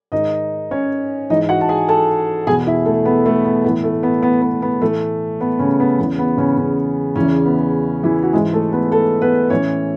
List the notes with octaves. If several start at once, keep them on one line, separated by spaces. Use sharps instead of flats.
G#2 D#3 D#4 D#5
C#4 C#5
G#2 E3 D#4 D#5
F#4 F#5
A5
G#4 G#5
A4 A5
E2 B2 G#4 G#5
E4 E5
A3 A4
B3
A3
B3
A2 E3 B3
A3
B3
B3
B3
B3
A2 E3 A3
B3
C#3 C#4
B3
E2 C#3 E3 B3
B3
C#3 C#4
C#3 C#4
E2 C#3 E3 C#4
B3
E3 E4
F#4
G#2 E3 G#3 G#4
A3 A4
B3 B4
A3 A4
B3 B4
A2 E3 C#4 C#5